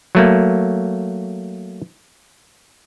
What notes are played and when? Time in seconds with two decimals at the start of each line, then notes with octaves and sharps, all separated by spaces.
0.15 F#3 A3 A#3